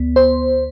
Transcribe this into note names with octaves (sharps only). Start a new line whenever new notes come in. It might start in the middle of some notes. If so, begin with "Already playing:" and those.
Already playing: D2 B3
C5